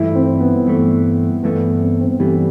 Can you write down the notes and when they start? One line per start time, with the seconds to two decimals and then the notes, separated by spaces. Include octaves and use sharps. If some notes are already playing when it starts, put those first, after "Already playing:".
Already playing: G2 E3 A3 E4
0.15 C4
0.40 B3
0.67 G2 E3 A3
1.43 G2 E3 A3 B3
1.81 C4
2.00 C4
2.20 G2 E3 G3 A3